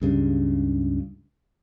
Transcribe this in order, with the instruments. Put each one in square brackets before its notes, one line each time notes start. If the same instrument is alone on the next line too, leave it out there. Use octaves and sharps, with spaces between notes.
[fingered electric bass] C#2 G2 C#3